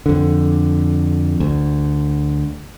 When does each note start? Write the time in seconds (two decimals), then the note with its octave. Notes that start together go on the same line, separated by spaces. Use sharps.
0.06 F2 D3
1.40 D2